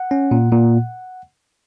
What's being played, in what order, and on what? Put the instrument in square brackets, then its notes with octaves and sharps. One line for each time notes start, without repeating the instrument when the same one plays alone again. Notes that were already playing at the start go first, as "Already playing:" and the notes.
Already playing: [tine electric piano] F#5
C#4
A#2
A#2